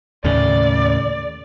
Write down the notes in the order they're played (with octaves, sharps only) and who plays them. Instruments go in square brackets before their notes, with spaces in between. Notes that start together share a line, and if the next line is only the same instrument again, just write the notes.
[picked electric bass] D#2 A2 C#3 [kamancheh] D5